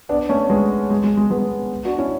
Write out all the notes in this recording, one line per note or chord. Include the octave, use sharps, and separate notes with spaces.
B3 D4
A3 C#4
G#3 B3
G#3
G#3
G#3
G#3 B3
D4 F#4
C#4 E4